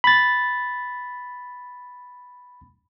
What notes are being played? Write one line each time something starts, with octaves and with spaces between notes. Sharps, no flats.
B5 A6